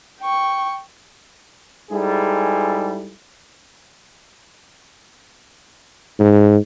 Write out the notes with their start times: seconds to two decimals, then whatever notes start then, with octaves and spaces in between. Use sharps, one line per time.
0.22 G5 C#6
1.90 G#2 G3 E4 G#4 A4
6.19 G#2